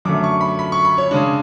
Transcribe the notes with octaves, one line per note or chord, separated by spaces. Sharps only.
F#2 D3 A3 D6
C#6
B5
B5
C#6
B5
C#5
C#3 G#3 D4